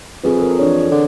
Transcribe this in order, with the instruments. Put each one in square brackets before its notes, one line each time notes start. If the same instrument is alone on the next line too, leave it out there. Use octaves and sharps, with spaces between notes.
[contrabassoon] F2 [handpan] C4 G#4 B4
[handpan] A4 A#4
E3 D4 C#5
[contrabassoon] D3